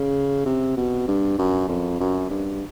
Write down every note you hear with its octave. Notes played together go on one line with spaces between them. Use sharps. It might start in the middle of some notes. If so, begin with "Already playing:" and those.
Already playing: C#3
C3
B2
G2
F#2
F2
F#2
G2